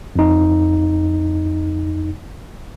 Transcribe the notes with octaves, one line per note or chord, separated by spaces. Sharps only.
F2 D#4